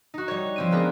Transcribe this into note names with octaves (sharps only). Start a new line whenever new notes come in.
D#4 F#4
G3 C#5
F3 C4 D#7
G#3 A#3 B3 D4 G#4